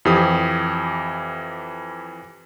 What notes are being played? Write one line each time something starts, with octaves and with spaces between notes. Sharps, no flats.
F2 E3 G4 D#6